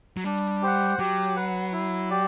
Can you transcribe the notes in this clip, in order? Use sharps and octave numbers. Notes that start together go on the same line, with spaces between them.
F#3
G3 D4
G4 C5 F#5
F#3 G4
B4 F#5
E4
G4 D5